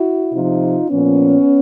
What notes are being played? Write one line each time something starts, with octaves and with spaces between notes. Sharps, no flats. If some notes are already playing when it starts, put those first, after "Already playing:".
Already playing: E4 F#4
C3 F3 D#4 F4
A#2 F3 B3 C#4